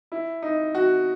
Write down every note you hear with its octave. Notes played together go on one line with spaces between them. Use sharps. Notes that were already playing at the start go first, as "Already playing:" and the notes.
E4
D#4
F#4